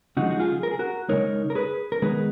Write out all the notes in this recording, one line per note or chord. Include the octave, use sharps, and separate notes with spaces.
C#3 F3 G#3 D#4 F#4
F#4
F4 G#4
A#4
G#4
F#4 A#4
C#3 G#3 D#4 A#4 C#5
A#4
G#4 B4
A#4
D#3 G#3 B3 D#4 G#4 B4